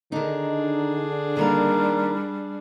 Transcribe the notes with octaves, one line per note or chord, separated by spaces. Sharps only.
D3 D#3 D4 D#4 G#4
D#3 G3 A#3 A#4